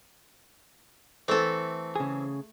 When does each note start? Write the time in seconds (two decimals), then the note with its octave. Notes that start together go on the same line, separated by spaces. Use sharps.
1.28 E3 A3 C4 A4
1.96 C#3 G#4